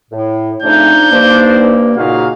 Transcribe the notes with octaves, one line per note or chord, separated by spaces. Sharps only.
A2
C#3 F3 A3 C4 D4 D#4 G6
G2 A#3 D4 D#4 C5
A#2 C#3 D#4 F#4 G#4 F5